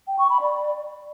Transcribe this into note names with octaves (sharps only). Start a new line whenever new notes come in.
G5
C#6
B5
D5